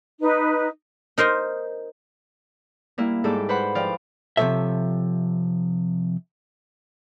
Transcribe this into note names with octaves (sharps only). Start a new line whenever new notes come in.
D#4 B4
D#4 A#4 C5 D#5
G3 A#3 E4
G#2 G3 A4 D6
B4 C5 F#5 B5
F3 D5 F5 G5
C3 F3 A#3 A4 C#5 E5